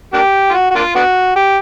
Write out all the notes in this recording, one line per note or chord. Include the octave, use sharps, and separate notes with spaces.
A#3 D4 G4
F4
F#4
F#4
A#3 D4 F4
B3 D4 F#4
G4